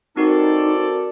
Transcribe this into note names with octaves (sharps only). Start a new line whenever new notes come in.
C4 D#4 F#4 A4 A#4 C5 D5